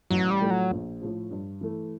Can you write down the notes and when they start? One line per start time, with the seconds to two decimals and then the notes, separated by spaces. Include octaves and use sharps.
0.11 A1 F#3
0.31 G3
0.41 A2 F3 A3
0.50 F#3
0.71 A#1
1.01 A2 F3
1.31 G2
1.61 E3 A3